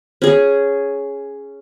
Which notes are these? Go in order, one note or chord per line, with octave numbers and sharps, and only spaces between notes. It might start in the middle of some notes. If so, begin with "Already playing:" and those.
C#4 G#4